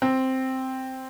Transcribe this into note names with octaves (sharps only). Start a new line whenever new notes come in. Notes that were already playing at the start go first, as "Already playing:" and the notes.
C4